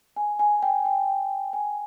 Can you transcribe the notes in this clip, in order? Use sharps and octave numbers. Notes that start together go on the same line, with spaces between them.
G#5
G#5
G5
G5
G#5